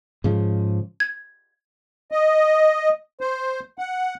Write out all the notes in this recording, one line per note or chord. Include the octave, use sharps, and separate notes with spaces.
G#2 C#3 F3
G#6
D#5
C5
F#5